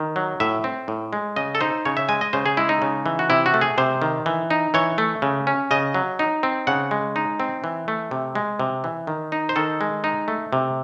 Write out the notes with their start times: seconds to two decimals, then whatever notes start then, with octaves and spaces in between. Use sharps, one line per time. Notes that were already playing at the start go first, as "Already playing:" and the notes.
Already playing: D#3
0.16 F#3
0.40 A2 E5
0.64 C4
0.88 A2
1.13 G#3
1.36 C#3 D#5
1.55 A4
1.61 D#4 C5
1.85 C#3 C#5
1.97 E5
2.09 G#3 G#5
2.21 D#5
2.33 C#3 C5
2.46 G#4
2.57 G#3 E4
2.69 D#4
2.82 C#3
3.06 E3
3.19 F#4
3.29 C3 E4
3.46 F#4
3.54 A3
3.61 G#4
3.78 C3 C5
4.02 D#3
4.26 E3
4.50 D#4
4.74 E3 C#5
4.98 A3
5.22 C#3
5.47 C#4
5.71 C#3 D#5
5.94 F#3
6.19 D#4
6.43 C4
6.67 C#3 F#5
6.91 G#3
7.16 D#4
7.40 C4
7.64 E3
7.88 A3
8.11 C3
8.35 G#3
8.60 C3
8.84 E3
9.07 D#3
9.32 D#4
9.49 C5
9.56 D#3 A4
9.81 G#3
10.04 D#4
10.28 A3
10.53 C3